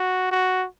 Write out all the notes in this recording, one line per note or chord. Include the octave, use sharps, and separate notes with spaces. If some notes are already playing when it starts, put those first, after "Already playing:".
Already playing: F#4
F#4